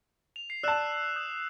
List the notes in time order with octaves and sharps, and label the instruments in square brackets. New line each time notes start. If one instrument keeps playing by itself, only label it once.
[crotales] F7
C7
[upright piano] D5 A5 [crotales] E6 F#6 E7
[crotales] D#6 G6